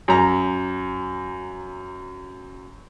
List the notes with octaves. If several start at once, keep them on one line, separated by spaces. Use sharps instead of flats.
F#2 A#5